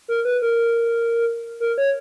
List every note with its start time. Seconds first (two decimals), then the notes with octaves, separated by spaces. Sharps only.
0.08 A#4
0.25 B4
0.42 A#4
1.60 A#4
1.78 C#5